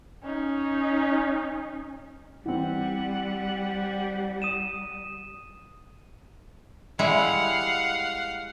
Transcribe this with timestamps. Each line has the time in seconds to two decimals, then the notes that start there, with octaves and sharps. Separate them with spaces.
0.24 C#4 D#4
2.46 E3 G3 C4 F#5
4.42 D#6 D#7 E7
6.99 G3 G#3 E4 F5 F#5